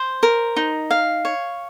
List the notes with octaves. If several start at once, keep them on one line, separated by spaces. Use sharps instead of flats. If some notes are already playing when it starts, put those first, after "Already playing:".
Already playing: C5
A#4
D#4
F5
C#5